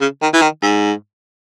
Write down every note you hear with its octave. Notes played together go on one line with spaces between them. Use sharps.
C#3
D#3
E3
D#3
G#2